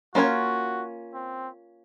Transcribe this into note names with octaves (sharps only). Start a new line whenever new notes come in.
A#3 C#4 F4 F#4 A#4 C#5
C4